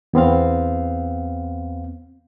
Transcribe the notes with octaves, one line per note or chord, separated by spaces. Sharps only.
E2 B3 C4 F5